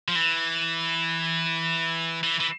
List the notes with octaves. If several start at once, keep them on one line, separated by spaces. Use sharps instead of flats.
F3
E3
E3
E3